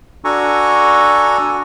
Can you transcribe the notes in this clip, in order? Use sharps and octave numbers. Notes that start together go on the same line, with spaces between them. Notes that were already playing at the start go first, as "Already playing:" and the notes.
D4 F#4 A4 G#5 A#5 C#6